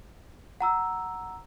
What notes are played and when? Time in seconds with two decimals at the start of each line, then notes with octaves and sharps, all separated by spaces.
0.61 F#5 A#5 E6